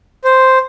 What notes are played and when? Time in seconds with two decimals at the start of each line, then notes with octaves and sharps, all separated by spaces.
0.24 C5